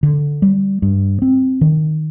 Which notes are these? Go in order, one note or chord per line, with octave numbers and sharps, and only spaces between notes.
D3
G3
G2
C4
D#3